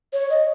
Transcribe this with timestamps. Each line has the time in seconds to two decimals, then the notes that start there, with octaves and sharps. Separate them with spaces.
0.13 C#5
0.30 D#5